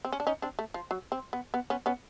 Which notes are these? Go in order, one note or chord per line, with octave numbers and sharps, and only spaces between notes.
C4
C#4
D4
C#4 D#4
C4 D4
A3
F3
F#3
C4
B3
B3
B3 C#4
B3 C#4